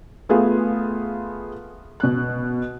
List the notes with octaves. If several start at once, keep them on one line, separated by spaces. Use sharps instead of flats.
A3 B3 F4 G#4
B2 F#6